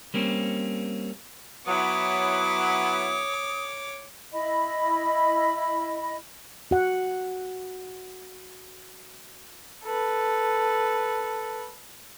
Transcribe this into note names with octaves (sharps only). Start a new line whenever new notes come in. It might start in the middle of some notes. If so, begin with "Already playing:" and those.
G3 A#3 C4 C#4
F#3 B3 E4 C#5 D6 D#6
E4 D#5 B5
F#4 F#5
A4 B4